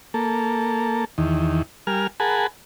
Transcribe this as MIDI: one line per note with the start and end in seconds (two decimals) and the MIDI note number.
0.14 1.05 58
0.14 1.05 69
1.18 1.62 40
1.18 1.62 51
1.87 2.07 55
1.87 2.07 70
1.87 2.07 80
1.87 2.07 89
2.20 2.47 68
2.20 2.47 70
2.20 2.47 78
2.20 2.47 80
2.20 2.47 81
2.20 2.47 83